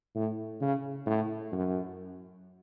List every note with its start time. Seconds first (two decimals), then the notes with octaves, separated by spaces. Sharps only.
0.15 A2
0.61 C#3
1.06 A2
1.52 F#2